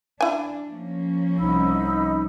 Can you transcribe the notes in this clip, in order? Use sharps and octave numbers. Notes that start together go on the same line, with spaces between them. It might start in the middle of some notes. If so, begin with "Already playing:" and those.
D4 E4 G#5
F3 A#3 C#4
C2 D#4 B5 E6